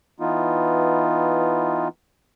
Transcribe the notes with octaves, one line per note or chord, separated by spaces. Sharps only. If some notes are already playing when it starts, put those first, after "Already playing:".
E3 B3 D#4 F4